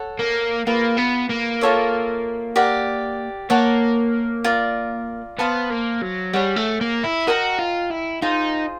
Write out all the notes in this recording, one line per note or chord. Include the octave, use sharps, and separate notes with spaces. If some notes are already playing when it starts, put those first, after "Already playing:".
Already playing: A4 C#5 F#5
A#3
A#3 F4 G#4 B4
B3
A#3
F4 A4 C#5 E5
G4 A#4 D5 F#5
A#3 C#5 F#5 A5
F4 A#4 D5
B3 C5 F5 A5
A#3
F#3
G3 G#4 C#5 F#5
A3
A#3
E4
F#4 A#4 D#5 G5 A#5
F4
E4
D#4 F4 G#4 C5